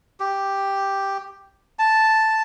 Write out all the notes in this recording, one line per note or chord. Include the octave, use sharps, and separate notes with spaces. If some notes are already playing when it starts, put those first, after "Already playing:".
G4
A5